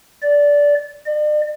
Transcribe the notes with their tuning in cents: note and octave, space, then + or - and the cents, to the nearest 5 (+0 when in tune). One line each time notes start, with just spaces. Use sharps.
D5 -15
D5 +40